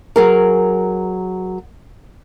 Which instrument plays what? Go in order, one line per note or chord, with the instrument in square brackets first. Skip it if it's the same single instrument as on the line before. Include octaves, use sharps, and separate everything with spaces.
[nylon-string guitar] F#3 G#4 A#4